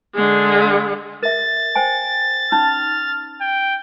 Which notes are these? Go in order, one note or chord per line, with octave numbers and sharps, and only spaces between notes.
D3 G#3
A#4 E5 A6
C5 G5 G#5
C#4 D#4 F6
G5